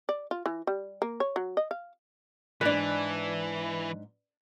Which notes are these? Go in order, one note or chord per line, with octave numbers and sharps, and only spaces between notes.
D5
F4
E3
G3
A#3
C#5
F#3
D#5
F5
G#2 E3 D4 B4 D5